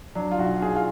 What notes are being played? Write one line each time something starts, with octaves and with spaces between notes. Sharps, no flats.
F#3 D4
F4
B1 F#4
B1 G#4
F4